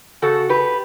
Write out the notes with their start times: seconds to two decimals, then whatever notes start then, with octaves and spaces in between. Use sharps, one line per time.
0.22 C#3 F#4 A4
0.49 G4 B4